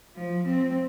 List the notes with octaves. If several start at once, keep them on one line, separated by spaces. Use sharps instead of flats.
F3
C4